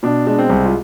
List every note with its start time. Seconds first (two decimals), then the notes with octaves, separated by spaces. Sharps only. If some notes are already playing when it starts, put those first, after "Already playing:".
0.03 B2 D4
0.27 G#3 D4
0.39 C4
0.49 C2
0.65 F4